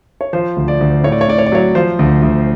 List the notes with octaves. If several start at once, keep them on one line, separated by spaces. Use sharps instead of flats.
C#5
F3 C5
D2
D5
D2
A2 C#5
D5
C#5
A2 D5
C#5
D5
F#3 C#5
F3 C5
D2
D2